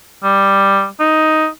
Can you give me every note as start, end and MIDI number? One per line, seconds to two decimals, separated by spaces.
0.23 0.87 55
1.00 1.47 63